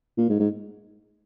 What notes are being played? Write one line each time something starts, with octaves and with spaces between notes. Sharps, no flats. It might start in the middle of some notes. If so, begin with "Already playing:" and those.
A#2
G#2
G#2